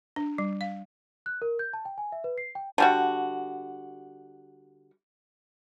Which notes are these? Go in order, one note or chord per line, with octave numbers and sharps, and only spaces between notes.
D4
G3
F5
F#6
A#4
G6
A5
G5
G#5
E5
B4
C7
G5
D3 G3 F#4